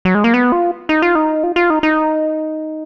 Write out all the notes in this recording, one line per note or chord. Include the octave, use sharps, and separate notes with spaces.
F#3
G#3
A#3
B3
F4
D#4
F4
D#4
F4
F4
D#4
D#4